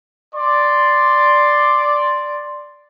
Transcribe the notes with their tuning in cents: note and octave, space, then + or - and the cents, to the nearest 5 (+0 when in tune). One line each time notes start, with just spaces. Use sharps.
D5 +0 C6 +0